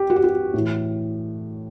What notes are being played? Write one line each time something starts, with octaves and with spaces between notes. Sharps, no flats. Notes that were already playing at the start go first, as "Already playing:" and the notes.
Already playing: G4
F#4
G4
F#4
A2 E3